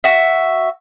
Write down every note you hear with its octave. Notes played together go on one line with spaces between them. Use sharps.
F#4 E5